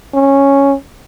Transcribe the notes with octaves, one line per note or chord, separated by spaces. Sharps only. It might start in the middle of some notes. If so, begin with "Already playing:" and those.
C#4